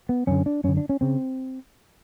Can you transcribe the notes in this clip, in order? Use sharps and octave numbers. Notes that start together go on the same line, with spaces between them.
B3
F#2 D3 C#4
D4
F#2 D3 C#4
D4
C#4
C#3 C4